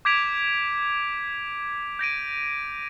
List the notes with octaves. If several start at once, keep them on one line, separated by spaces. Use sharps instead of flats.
D6 G6 G#6 B6 D7 F7
G6 A#6 D7 D#7